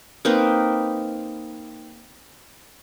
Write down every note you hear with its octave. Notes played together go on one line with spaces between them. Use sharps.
A#3 C4 D#4 B4